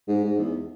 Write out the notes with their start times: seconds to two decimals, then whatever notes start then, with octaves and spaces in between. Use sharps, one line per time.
0.08 G#2
0.24 G#2
0.39 E2